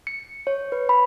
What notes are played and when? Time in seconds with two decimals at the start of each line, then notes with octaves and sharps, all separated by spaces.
0.07 C#7
0.47 C#5
0.72 B4
0.89 B5